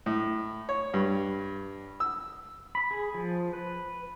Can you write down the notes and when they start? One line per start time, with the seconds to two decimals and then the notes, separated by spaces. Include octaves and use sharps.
0.06 A2
0.69 C#5
0.94 G2
2.00 E6
2.75 B5
2.91 G#4
3.14 F3
3.53 B4